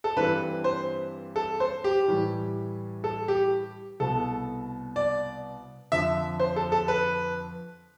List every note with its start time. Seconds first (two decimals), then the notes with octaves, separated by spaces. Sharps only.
0.04 A4
0.16 G2 E3 G3 C4 B4
0.64 C5
1.36 A4
1.60 C5
1.84 G4
2.08 A2 E3 G3
3.04 A4
3.28 G4
4.00 C2 B2 B3 A4
4.96 D5
5.92 F2 D3 F3 E5
6.39 C5
6.56 A4
6.72 A4
6.88 B4